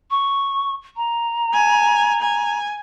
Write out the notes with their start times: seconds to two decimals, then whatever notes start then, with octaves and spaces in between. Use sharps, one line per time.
0.11 C#6
0.97 A#5
1.54 G#5
2.22 G#5